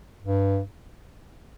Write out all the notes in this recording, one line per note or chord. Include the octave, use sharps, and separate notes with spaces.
G2